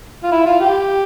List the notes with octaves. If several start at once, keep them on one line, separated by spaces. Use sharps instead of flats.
F4
E4
F4
G4